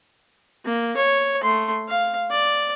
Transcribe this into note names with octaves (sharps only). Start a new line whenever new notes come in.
A#3
C#5
A3 C6
F5
D5